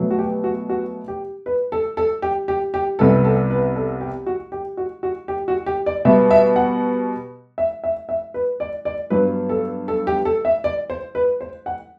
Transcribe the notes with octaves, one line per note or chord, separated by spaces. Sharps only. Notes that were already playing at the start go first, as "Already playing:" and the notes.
Already playing: B2 F#3 A3
F#4
G4
F#4
F#4
G4
B4
A4
A4
G4
G4
G4
C2 C3 G3 B3 A4
A4
B4
A4
G4
F#4
G4
F#4
F#4
G4
F#4
G4
D5
B2 G3 B3 E5
E5
F#5
E5
E5
E5
B4
D5
D5
G2 F#3 B3 B4
A4
A4
G4
A4
E5
D5
C5
B4
C5
F#5